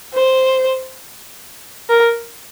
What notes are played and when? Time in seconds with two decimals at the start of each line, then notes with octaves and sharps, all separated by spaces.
0.14 C5
1.89 A#4